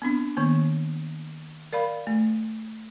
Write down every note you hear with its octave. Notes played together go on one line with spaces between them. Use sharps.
B3 C4 D4
D#3 A#3 B3
A#4 D5 F5 B5
A3